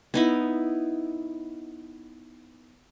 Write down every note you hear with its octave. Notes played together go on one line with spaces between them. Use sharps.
B3 D#4 E4